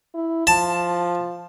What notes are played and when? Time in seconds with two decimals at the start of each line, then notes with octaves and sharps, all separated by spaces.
0.14 E4
0.47 F3 A5